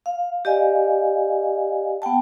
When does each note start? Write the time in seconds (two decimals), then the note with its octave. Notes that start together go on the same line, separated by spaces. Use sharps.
0.06 F5
0.45 G4 D5 D#5 F5 G#5
2.02 B3 F#5 G5 A5